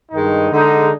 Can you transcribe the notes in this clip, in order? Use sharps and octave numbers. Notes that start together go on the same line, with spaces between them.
G2 D#3 G#3 D#4
D3 G#3 D#4